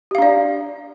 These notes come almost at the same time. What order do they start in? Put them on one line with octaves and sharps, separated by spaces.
G4 F5 D4 D5